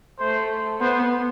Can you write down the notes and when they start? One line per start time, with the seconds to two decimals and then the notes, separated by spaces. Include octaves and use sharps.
0.20 A3 C5
0.80 B3 C5